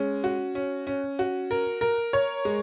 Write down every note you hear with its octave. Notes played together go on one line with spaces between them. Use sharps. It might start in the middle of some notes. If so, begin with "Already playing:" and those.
Already playing: G#3 C#4
F#4
C#4
C#4
F#4
A#4
A#4
C#5
G#3